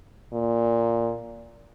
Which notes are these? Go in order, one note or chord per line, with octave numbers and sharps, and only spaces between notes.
A#2